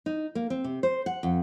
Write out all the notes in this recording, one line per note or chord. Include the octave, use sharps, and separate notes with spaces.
D#4
A#3
C4
C3
C5
F#5
F2